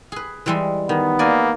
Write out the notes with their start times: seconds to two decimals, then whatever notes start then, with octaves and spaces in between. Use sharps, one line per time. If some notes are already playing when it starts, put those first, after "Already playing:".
0.12 G#4 B4
0.46 E3 G3 G#3
0.89 D#3 B3
1.19 A#3 D5 G#5